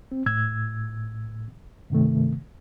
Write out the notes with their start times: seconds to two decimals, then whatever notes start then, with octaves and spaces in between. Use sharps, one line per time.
0.12 C4
0.26 A2 E6 G#6
1.90 G2 C3 D#3 A3